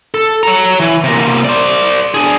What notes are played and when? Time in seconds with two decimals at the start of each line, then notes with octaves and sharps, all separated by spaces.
0.14 A4
0.43 C#5 A#5
0.80 E3
1.04 C3 A#3
1.45 C5 D5
2.14 D4 G#4